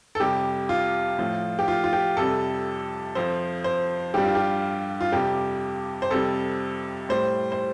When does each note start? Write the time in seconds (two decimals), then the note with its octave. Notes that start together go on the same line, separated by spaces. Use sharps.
0.15 A4
0.20 F2 C3 G3 G4
0.69 F4
1.19 A2 F3
1.59 G4
1.68 F4
1.84 F4
1.93 G4
2.17 F2 C3 G3 A4
3.15 F2 F3 C5
3.64 C5
4.14 G2 G3 G4
4.25 F4
4.35 G4
5.01 F4
5.12 F2 C3 G3 G4
6.02 C5
6.11 F2 C3 G3 A4
7.09 A2 G3 C5
7.52 C5